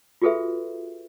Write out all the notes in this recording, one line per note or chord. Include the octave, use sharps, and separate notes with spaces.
F4 F#4 G#4 A4 B4 E5